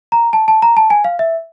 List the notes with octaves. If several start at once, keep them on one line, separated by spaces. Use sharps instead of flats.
A#5
A5
A5
A#5
A5
G#5
F5
E5